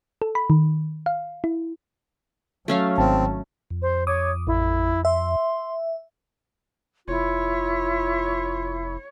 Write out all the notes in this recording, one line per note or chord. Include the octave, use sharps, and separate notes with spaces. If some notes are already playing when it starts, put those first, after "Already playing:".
A4
B5
D#3
F5
E4
F#3 A3 C#4 F5
G#1 C4 A5
F2
C5
C#5 D6 D#6
A1 E4
E5 C6
F1 E4 F4 C#5